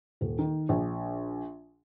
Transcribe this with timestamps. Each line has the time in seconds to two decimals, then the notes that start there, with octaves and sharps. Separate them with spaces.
0.21 D#1
0.39 D#3
0.69 A#1